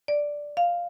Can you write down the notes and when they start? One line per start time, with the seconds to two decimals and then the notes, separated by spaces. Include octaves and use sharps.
0.08 D5
0.57 F5